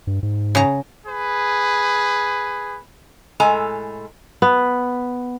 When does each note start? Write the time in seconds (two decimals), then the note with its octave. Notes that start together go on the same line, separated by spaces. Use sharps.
0.07 G2
0.23 G#2
0.55 C#3 A#5
1.06 G#4 B4
3.40 A2 G#3 A4 G#5 A#5
4.42 B3